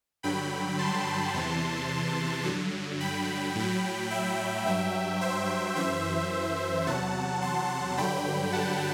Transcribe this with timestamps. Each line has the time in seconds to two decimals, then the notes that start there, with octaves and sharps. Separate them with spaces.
0.23 G2 D3 F#3 G5 B5
0.79 A5 C6
1.34 E2 C3 E3
2.44 G2 D3 F#3
3.00 G5 B5
3.55 A2 F#3
4.10 E5 G5
4.66 G2 F#3 E5 G5
5.21 C5 E5
5.76 F#2 E3 C5 E5
6.87 E2 C3 F#3 F#5 A5
7.42 A5 C6
7.97 G2 D3 F#3 G5 B5
8.53 F#5 A5